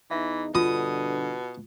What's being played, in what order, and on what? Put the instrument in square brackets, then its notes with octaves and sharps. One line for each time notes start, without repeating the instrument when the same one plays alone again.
[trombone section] E2 D#4 [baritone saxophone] E3 [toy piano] E5
[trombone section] G2 D3 [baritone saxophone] B2 [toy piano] F4 [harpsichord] D#6